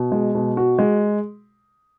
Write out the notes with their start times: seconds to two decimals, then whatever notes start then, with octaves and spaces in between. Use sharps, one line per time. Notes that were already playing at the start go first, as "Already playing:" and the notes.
Already playing: B2
0.12 G#3
0.35 B2
0.57 F#4
0.79 G#3